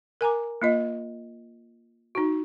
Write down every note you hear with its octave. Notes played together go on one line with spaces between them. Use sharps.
A#4 G#5 A#5 D6
A#3 F4 D#5
D#4 F#4